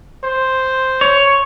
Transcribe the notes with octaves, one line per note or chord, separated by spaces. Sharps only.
C5
C#5